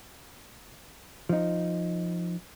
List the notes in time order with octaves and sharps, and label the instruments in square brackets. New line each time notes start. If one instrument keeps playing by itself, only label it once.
[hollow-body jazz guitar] F3 D#4